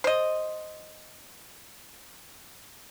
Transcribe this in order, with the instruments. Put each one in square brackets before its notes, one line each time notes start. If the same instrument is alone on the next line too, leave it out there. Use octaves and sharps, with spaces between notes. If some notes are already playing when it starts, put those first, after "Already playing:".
[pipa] C5 D#5